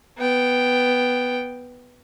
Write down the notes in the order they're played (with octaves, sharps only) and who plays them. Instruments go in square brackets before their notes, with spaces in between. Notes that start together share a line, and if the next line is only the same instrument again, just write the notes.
[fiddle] B3 G5